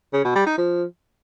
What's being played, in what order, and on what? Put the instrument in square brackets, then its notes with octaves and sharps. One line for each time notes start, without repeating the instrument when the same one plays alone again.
[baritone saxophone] C#3
B2
G3
D#4
F3